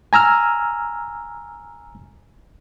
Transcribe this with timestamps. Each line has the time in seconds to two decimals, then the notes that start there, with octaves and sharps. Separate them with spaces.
0.13 G#5 A#5 E6 F6